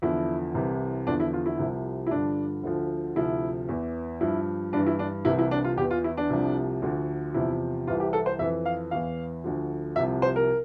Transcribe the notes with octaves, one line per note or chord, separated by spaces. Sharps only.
E2 D3 F3 E4
C2 C3 E3
E2 D3 F3 D4
E4
F4
E4
C2 C3 F3
E4
G2 D3 F3 D4
D2 D3 F3
D2 C3 F3 E4
E2 E3
G2 F3 E4
G2 E3 D4
E4
D4
C2 C3 E3 E4
E4
D4
F4
E2 E3 G4
F4
E4
D4
C2 C3 F3
D2 D3 F3
E2 C3 F3 E4
C2 C3 E3 F4
G4
A4
C5
F2 E3 E5
F5
E2 E3 F5
D2 D3 F3
C2 C3 F3 E5
C5
A#4